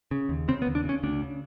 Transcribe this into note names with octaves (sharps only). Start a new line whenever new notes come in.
C#3
D#2
C#3 C4
B3
D#2
D4
C#3 C#4
D2 D4
C#3